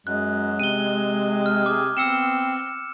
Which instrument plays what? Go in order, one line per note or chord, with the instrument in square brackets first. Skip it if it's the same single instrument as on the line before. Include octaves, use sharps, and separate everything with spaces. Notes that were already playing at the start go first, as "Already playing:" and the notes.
[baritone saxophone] F#2 [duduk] G#3 [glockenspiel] F#6
[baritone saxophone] C3 [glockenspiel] D#7 G7
[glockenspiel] F6
[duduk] G#4 [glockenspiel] D6
[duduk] B3 [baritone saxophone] C4 [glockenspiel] E6 C#7 E7